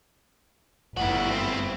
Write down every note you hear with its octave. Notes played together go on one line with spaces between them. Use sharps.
G1 G3 E4 F#4 B4
G2 C4